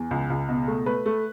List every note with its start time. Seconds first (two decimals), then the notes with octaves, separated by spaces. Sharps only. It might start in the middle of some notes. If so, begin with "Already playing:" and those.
Already playing: E2
0.11 C#2
0.30 C#2
0.49 B2
0.68 A3
0.86 A3 B4
1.06 A3